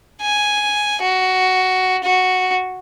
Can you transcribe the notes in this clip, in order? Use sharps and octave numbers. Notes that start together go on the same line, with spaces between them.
G#5
F#4
F#4